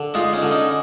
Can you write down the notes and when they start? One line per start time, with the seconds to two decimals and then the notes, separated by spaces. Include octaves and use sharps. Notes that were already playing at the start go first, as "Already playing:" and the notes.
Already playing: D3
0.14 G#3 D#4 F4
0.33 C#4 D#4
0.42 D3
0.51 C#4 D#4